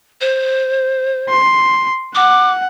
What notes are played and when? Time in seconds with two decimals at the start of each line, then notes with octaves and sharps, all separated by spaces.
0.21 C5
1.29 C6
2.15 F#5 D6